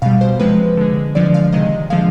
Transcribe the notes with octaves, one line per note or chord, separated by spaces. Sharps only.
B2 G3 F5
C5
C3 F3 G#3 B4
D3 G#3
D3 F3 G#3 D5
F5
C3 D#3 G#3 D#5
D3 F3 G#3 F5